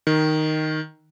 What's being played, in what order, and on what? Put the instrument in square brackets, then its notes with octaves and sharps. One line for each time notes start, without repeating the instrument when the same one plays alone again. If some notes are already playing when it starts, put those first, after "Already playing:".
[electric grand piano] D#3